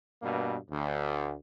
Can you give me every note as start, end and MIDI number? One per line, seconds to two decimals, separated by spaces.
0.22 0.56 43
0.22 0.56 47
0.22 0.56 58
0.71 1.35 38